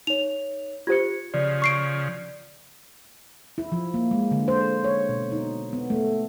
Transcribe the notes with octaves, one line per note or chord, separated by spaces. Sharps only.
D#4 C#5 F7
F4 G4 C5 G#6 C#7
C#3 F3 D5
C#6 C7 D7
E4
F3
A#3
G#3
D3
C5
C#5
B2
D#4
B3
A3